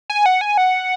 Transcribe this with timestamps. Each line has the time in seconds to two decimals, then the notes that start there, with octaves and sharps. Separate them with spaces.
0.10 G#5
0.26 F#5
0.41 G#5
0.58 F#5